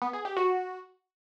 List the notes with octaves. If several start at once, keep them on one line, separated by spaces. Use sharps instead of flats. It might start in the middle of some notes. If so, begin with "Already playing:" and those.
B3
G#4
G4
F#4